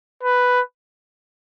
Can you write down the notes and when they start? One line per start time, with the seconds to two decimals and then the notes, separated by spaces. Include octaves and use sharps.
0.23 B4